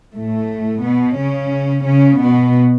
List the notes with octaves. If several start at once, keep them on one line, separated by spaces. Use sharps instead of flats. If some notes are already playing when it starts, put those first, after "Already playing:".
A2 A3
B2 B3
C#3 C#4
C#3 C#4
B2 B3